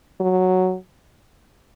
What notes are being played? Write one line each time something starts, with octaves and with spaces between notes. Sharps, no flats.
F#3